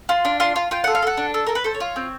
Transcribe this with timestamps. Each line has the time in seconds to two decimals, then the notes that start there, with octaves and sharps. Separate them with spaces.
0.09 F4 C6
0.25 D4
0.40 F4 C6
0.56 F4
0.71 F4 G5
0.84 A4 F#5
0.95 F5
1.02 A4 F#5
1.17 D4
1.34 A4
1.47 A4 A#4
1.55 B4
1.64 A4 C5
1.75 C#5
1.80 F4
1.96 C4